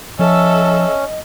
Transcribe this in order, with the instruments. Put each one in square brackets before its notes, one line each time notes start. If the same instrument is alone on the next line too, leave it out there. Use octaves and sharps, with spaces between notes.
[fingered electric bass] F3 [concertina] C#4 [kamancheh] A4 E5 [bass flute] D#5